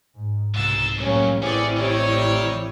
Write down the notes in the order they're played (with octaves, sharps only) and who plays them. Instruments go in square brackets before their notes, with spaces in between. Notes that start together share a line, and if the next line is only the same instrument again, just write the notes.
[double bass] G#2
[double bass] C2 B2 [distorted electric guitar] G#2 [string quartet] E6 A6
[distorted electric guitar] F#2 [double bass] A2 A#3 [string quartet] G3 C#4
[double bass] A1 E4 [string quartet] C4 [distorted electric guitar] C#4 [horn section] G#4 B4 D5
[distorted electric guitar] D#3 [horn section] G3 C#5